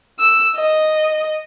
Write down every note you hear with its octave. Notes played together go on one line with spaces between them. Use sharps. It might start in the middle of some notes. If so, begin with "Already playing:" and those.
E6
D#5